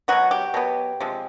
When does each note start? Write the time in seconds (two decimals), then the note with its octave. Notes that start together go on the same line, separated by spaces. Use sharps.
0.08 B2 F#3 B3 F#4
0.31 G4
0.54 B2 F#3 B3
1.00 C3 F3 G#3